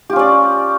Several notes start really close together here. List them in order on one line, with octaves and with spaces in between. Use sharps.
G4 F4 C#4 D5